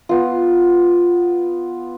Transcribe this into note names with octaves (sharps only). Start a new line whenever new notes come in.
B3 F4